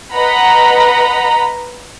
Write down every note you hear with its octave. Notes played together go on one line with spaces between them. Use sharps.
B4 D#5 F#5 A#5 B5